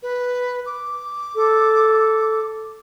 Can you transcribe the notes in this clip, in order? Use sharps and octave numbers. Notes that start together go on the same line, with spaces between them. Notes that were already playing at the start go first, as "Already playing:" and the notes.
B4
D6
A4